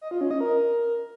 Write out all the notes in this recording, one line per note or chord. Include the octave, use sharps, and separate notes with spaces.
D#5
F4
C#4
D#5
A#4